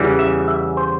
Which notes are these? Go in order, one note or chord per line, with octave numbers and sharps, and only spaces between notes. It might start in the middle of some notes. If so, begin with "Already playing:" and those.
Already playing: E2 C#3 E3 G3
E5
E5
C5